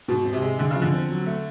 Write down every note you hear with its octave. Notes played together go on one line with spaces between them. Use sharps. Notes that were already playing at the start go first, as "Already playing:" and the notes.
G#2 B2
C4
C3
G#3
D3 G#3
C#3
F3
D3
C4
F#3
A3